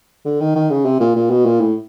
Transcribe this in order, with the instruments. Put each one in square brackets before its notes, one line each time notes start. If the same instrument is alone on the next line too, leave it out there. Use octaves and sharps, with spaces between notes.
[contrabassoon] D3
D#3
D#3
C#3
C3
A#2
A#2
B2
A#2
A2